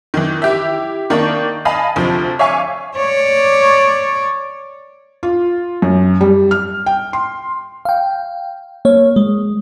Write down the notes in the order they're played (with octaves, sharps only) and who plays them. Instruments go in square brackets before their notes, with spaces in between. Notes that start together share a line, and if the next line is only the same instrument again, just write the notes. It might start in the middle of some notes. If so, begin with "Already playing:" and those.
[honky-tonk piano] D#3 E3
E4 G4 E5
D#3 A#3 D4 C#6
D#5 F5 G#5 A5 B5 D#6
D2 C3 F3
C#5 E5 F5 G#5 C#6 D6
[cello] C#5 D5
[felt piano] F4
F#2
G3
F6
G5
C6
[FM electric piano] F5 G5
A#3 C#5
G#3